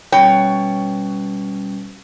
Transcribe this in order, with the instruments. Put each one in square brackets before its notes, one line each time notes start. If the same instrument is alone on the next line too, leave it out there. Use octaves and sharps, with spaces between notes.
[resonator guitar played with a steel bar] B2 C#5 G5 [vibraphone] G3 C#4